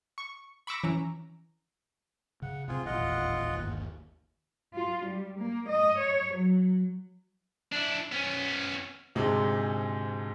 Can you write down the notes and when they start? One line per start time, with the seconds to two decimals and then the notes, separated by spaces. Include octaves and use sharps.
0.18 C#6
0.67 B5 C#6 D6 E6 A#6
0.84 E3 C#4 A#5
2.42 C#3 F#5
2.68 C3 A3 C4 F4 G#4
2.86 D#1 A1 E2 F4 D#5 F#5
3.56 G1 D#2
4.74 F4
5.06 G3
5.39 A#3
5.68 D#5
5.98 C#5
6.34 F#3
7.72 D4 E4
8.12 B3 C#4
9.15 D2 G#2 C3 G#3 A5